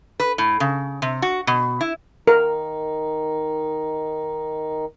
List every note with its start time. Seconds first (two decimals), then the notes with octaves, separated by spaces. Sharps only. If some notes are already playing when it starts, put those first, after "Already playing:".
0.20 B4
0.38 A2
0.60 C#3
1.02 C3
1.22 F#4
1.47 B2
1.81 E4
2.27 D#3 D#4 A#4